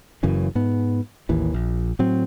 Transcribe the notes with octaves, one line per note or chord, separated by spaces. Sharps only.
F#1 F#2 C#3 E3
G#2 B3
A1 D#2 E3
A#1
A2 F#3 C4